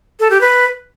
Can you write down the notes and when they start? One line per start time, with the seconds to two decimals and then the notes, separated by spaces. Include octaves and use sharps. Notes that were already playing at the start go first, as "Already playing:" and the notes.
0.20 A4
0.30 G4
0.41 B4